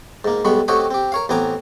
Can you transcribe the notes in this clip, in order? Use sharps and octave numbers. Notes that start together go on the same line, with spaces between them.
G#2 A#3
B1 G3 G#3 B3 B5 C#6
A3 C4 F#4 G4 C#5 D#5
C4 G4
A#4 C#5 F5
A1 B3 C4 G#5 A#5 D6